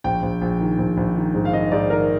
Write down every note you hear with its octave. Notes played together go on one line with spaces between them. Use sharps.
A#1 G5
A#1
A#1
D#3
A#1
A#1
D#3
G#2
F5
D#3 D#5
G#2 D5
D#3 A#4